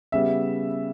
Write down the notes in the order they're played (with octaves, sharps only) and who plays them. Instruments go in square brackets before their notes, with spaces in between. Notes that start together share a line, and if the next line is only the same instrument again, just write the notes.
[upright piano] C#3 G3 B3 E5